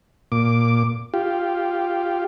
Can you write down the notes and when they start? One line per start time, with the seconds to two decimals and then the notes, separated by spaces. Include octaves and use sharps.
0.32 A#2 D6
1.14 F4 G4